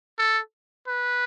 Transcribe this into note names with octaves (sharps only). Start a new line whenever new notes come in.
A4
B4